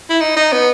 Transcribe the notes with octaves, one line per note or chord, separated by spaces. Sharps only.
E4
D#4
D#4
B3